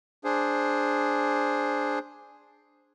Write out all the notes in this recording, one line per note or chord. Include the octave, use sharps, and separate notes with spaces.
D4 G#4 C5